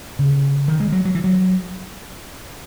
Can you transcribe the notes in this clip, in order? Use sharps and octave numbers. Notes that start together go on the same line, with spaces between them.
C#3
D#3
G#3
F#3
F#3
E3
F#3